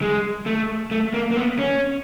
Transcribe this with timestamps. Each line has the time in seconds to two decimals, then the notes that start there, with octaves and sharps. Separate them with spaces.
0.01 G#3
0.46 A3
0.91 A3
1.14 A#3
1.31 A#3
1.36 B3
1.59 C#4